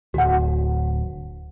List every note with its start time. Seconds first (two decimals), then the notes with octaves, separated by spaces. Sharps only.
0.14 D1 F#4 F#5